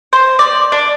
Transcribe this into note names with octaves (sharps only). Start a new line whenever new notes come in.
C5
D5
D4